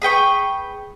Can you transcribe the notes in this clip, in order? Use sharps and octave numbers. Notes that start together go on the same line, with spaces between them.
G#4 B4 G5 C#6